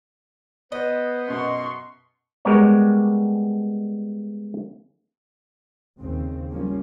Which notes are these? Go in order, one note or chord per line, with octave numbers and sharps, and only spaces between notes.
B3 C5 D#5
F#2 B2 C6 C#6
G3 G#3 B3 A#4 C#5 D5
D#2 C#3 C4
F3 G3 A#3 C#4